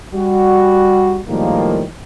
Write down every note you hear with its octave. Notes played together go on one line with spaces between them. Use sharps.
G3 F#4
A2 D#3 F3 G3 G#3 A#3